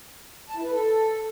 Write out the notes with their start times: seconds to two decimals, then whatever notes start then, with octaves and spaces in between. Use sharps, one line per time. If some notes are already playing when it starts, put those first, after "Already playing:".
0.49 A5
0.57 E4
0.64 B4
0.71 A4